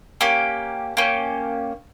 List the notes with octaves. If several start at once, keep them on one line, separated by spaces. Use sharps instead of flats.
A#3 C#4 G4
A#3 C#4 G4